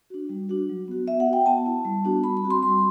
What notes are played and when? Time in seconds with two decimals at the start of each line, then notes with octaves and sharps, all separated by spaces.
0.10 D4 F#4
0.29 G3
0.49 D4 F#4
0.69 F#3
0.88 B3 F#4
1.07 B3 E5
1.20 F#5
1.28 F#4
1.33 G5
1.46 B3 A5
1.66 E4
1.85 G3
2.05 B3 D4 F#4
2.23 G3 B5
2.37 B5
2.43 C4 F#4
2.51 C6
2.63 G3 C6